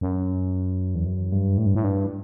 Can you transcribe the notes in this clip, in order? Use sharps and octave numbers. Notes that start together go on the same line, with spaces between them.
F#2
E2
F#2
G2
A2
G2
A2
G2